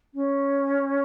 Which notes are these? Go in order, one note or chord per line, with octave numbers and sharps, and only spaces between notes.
C#4